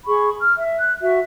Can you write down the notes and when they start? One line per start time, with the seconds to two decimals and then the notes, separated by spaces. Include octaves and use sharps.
0.06 G#4 B5 C#6
0.38 F6
0.59 E5
0.78 F#6
1.01 F#4 E5